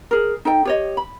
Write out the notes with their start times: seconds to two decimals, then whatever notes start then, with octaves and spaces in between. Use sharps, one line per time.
0.11 G#4 A#4
0.45 D#4 A4 G5
0.65 G4 C#5 D#5
0.97 B5